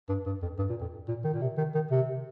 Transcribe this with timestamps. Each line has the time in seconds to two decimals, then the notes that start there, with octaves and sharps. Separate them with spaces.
0.09 G2
0.26 G2
0.42 F2
0.59 G2
0.70 A#2
0.81 F2
1.09 A#2
1.24 D#3
1.34 A#2
1.42 C3
1.58 D#3
1.75 D#3
1.91 C3